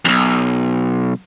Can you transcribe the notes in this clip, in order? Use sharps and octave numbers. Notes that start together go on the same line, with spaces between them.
B1 F2